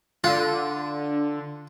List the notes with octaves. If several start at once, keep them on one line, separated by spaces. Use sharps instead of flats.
D3 F4